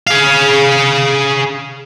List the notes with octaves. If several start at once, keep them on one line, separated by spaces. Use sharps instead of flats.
G#4 F5